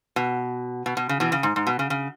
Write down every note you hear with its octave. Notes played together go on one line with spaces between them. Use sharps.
B2
B2
B2
C#3
B2 E3
C#3
G#2
G#2
B2
C#3
C#3